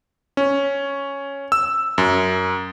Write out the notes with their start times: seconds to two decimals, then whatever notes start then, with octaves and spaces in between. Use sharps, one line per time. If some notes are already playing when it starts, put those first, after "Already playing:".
0.37 C#4
1.52 E6
1.98 F#2